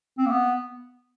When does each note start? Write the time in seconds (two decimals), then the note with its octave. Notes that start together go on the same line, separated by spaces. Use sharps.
0.18 C4
0.26 A#3
0.30 B3